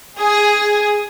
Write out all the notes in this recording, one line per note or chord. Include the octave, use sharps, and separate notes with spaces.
G#4